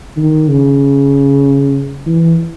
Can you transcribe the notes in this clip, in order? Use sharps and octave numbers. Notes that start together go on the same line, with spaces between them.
D#3
C#3
E3